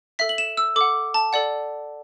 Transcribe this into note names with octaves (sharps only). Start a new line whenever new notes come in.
A4 E5 B6
F#7
E7
E6
A4 F#5 D6
A5
A4 D5 F#5